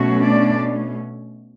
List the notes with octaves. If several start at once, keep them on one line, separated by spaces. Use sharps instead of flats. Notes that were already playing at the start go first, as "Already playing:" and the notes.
Already playing: B2 F#3 A3 C#4 F#4
D4 D5